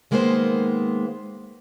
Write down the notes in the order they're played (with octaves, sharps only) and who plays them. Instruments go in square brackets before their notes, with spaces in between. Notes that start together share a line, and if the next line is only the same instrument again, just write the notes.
[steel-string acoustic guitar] D#3 G#3 A#3 B3 A#4 C5